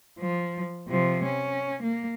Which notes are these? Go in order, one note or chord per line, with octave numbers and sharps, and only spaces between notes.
F3
C3 F3
C#4
A#3